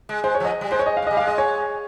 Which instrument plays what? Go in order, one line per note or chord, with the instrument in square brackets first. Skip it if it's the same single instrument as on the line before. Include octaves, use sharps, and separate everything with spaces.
[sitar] G#3
[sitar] G#3 [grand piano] C5
[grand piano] C#5
[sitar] F3 [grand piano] D#5
[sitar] G3
[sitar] G#3 [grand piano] C5
[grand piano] C#5
D#5
F5
[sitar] G#3
[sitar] G3 [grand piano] D#5
[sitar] G#3 [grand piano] F5
[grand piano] D#5
C#5